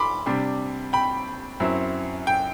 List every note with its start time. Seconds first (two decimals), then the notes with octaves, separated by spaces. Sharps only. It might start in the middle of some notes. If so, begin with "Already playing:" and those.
Already playing: B5 C6 D6
0.26 C3 G3 D4
0.93 G5 B5
1.60 F#2 F#3 C4 E4
2.27 G5